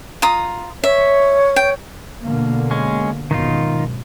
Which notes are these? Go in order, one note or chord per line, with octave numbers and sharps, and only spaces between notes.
F4 A#5 D#6
C#5 E5
G5
B2 D3 A#3
G#3 C#4
G#1 F#2 B2 D#3 D#4 F4